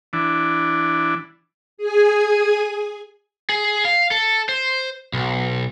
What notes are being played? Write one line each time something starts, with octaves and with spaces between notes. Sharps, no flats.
E3 D4
G#4 G#5
G#4
F5
A4
C5
B1